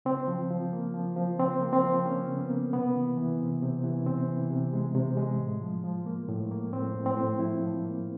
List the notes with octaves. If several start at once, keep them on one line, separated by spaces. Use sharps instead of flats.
C#3 C4
F3
F3
A#3
F3
F3
C#3 C4
A#3
C4
F3
A#3 C#4
C#3
B3
A#3
C3 B3
E3
E3
C3
C3
E3
C3 C4
E3
C3
G#3
C3
G#3
A2
F3
F3
A#3
A2
A#3
A2 C4
A2
C4
A2
F3 E4
F3
A#3